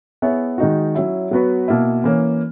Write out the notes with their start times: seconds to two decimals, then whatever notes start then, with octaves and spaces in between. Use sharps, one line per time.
0.22 B3 E4 G#4 C#5 E5
0.58 D#3 G#3 D#4 F#4
0.95 F#3 C#4 E4
1.31 F#3 B3 F#4 B4
1.68 B2 A#3 E4
2.04 E3 A#3 C#4